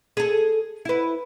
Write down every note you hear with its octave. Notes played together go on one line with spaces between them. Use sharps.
G#4 A4
E4 B4